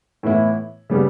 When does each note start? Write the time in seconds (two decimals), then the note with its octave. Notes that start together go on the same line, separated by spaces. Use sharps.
0.23 A2 E3 B3 E4
0.90 C#3 G3 B3